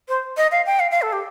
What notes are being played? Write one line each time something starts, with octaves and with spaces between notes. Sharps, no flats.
C5
D#5
F5
G5
F5
F5
A4
G4